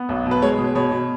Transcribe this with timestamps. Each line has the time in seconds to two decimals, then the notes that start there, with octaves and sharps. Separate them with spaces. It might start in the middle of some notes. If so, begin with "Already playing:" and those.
Already playing: B3
0.09 B1
0.26 B2
0.31 B4
0.42 G#3 C#5
0.59 B2
0.75 B2 C#5
0.91 B2